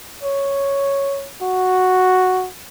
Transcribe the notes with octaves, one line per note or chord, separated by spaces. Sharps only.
C#5
F#4